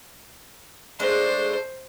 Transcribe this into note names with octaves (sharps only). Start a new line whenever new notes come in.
G#3 A3 D4 C5